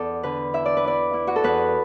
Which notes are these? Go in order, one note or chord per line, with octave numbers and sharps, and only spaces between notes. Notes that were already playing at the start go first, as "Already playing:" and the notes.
Already playing: E2 A4 D5
D3 B4
E4 E5
D5
B4
E4 D5
E4
F#4
A4
E2 B4